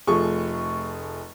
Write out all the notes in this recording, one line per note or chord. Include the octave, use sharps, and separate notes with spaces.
F1 F3 A3 G#4 C#6